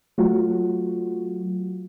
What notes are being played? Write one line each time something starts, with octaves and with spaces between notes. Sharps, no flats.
F#3 A3 F4 F#4